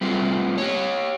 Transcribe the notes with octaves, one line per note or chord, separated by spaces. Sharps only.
G3 A3 B3 C4 F4
G4 C#5